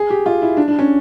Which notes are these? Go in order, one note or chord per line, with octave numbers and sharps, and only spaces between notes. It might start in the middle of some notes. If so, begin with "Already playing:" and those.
Already playing: G#4
G4
F4
E4
D4
D4
C#4